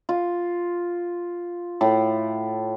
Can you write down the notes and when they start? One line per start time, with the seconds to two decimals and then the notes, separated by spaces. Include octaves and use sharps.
0.09 F4
1.81 A2